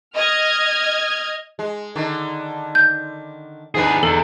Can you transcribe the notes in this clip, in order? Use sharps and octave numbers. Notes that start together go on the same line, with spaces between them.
D#5 F6 G#6
G#3
D3 D#3
G6
D#3 B3 D4 G#4 B4
E2 A4